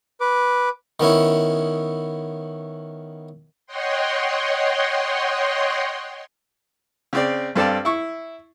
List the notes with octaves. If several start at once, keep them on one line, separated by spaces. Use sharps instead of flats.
B4 D6
D#3 B3 C#4 E4
C#5 D#5 F#5 G5 C6
C#3 C4 D5
G2 C4 A4 D5 F5 A5
E4 C#6